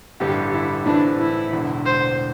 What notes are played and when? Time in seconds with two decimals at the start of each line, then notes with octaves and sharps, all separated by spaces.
0.20 A1 G2 D3 G4
0.53 E4
0.86 A2 E3 A3 C4 D4
1.20 E4
1.52 E1 E2 D3
1.86 C5